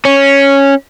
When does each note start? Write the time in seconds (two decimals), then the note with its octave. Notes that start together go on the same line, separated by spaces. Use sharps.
0.05 C#4